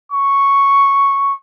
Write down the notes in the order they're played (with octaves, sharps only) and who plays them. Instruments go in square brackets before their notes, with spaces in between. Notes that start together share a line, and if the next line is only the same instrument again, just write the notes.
[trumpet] C#6